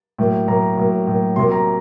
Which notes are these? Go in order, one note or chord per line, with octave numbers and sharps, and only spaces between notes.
A2 F#3 A#3
A2 F#3 A#3 A#5
A2 F#3 A#3
A2 F#3 A#3
C3 F#3 A#3 C6
A#5